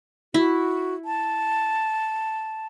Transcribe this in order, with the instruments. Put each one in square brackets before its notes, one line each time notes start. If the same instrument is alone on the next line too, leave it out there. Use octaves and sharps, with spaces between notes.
[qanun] E4 [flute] F#4
[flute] A5